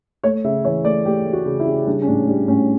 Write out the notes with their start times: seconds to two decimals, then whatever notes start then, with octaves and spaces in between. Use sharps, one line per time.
0.24 A3 C#5
0.44 C#3 E5
0.65 E3 C#5
0.85 A3 D5
1.05 A3 G4
1.26 A3
1.33 F#4
1.46 C#3
1.60 E4
1.67 C#3
1.86 G3 D4
2.02 C#4
2.07 A2 D4
2.27 G3 D4
2.48 A2 C#4